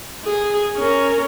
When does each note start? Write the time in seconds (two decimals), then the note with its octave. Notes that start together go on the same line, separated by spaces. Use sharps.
0.24 G#4
0.77 C#4 A#4